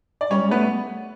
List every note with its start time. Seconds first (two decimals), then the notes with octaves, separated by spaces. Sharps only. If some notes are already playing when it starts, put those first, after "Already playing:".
0.21 D5
0.31 G3 C#4 C#5
0.41 G3
0.51 A3 B3 B4